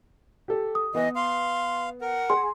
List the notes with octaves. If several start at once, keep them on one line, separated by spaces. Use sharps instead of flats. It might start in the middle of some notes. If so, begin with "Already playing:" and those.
G4 A4
D#6
E3 B3 D#5
F5 C6
A#4 F#5
G#4 C6